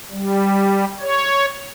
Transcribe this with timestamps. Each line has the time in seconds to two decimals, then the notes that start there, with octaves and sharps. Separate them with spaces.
0.11 G3
1.00 C#5